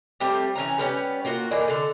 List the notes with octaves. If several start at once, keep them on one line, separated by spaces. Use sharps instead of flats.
G3 A3 C4 G4
E3 C#4 A#5
G3 B3 C#4 G4
A#3 F4 F#4
E3 A#3 D4 D#4
D3 A4